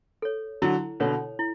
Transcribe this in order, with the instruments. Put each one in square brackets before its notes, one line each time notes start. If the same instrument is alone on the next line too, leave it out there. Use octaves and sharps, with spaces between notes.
[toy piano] A4 C#5
[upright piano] D3 F#3 [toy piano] E4
[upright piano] B2 D3 [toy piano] A4 C#5
[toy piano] E4